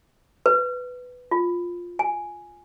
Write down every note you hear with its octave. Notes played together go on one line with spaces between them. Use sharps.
B4
F4
G#5